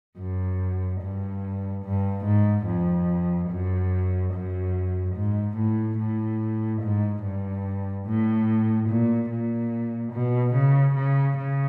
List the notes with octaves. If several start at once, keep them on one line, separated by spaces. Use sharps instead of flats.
F#2
G2
G2
G#2
F2
F#2
F#2
G#2
A2
A2
G#2
G2
A2
A#2
A#2
B2
C#3
C#3
C#3